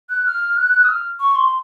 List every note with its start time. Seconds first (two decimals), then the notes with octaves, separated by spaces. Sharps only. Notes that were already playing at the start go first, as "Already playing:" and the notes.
0.09 F#6
0.26 F6
0.57 F#6
0.84 D#6
0.89 F6
1.20 C#6
1.36 C6